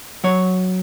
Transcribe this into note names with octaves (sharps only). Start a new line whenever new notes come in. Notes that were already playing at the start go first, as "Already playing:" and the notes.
F#3 C#5